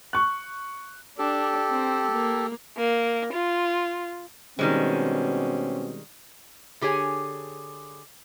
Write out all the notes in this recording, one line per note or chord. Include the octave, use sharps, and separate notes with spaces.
C#6 F#6
D4 G4 A4
C4
A#3
A#3
F4
B2 D#3 G3 G#3 C4 C#4
D3 G4 G#4 C#5 G#5